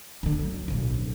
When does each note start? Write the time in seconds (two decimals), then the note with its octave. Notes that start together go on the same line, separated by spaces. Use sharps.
0.23 D2 D3
0.39 F#3
0.68 D1 B1